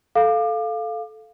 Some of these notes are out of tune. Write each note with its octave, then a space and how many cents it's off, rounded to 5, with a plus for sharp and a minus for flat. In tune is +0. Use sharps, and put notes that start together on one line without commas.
A4 -10 F5 +0 D6 +30